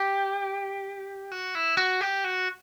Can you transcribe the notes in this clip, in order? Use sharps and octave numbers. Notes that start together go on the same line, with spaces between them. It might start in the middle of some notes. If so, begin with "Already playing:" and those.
Already playing: G4
F#4
E4
F#4
G4
F#4